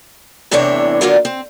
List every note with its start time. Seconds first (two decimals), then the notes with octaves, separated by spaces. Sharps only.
0.51 E2 A2 C3 E3 D4 C#5
1.01 D3 F#3 A#3 B3 F4 D5
1.25 C4